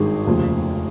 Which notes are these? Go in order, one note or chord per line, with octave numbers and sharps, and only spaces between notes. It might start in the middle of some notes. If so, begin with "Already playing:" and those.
Already playing: G#1 G2 D#3 G#4
F1 D#2 C#3 F3